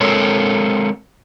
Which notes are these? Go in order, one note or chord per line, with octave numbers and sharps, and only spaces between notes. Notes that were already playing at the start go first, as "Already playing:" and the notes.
G#3 C4 A4 A#4 C#5